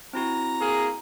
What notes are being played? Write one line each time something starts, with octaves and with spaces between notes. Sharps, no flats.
C4 E4 F#4 A#5
A#3 G#4